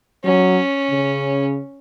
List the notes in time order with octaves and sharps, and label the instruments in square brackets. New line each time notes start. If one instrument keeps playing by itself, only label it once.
[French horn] F#3 [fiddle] C#4
[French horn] C#3